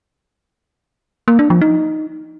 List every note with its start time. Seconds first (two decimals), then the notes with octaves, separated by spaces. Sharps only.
1.28 A#3
1.39 D4
1.50 F3
1.61 D#4